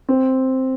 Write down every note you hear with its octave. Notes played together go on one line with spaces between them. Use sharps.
C4